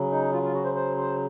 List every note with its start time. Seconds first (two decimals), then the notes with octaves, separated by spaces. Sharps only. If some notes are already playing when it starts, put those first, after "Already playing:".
Already playing: C#3 F#3
0.11 D#4
0.32 F4
0.43 F4
0.54 F#4
0.64 C5
0.75 C5
0.97 C5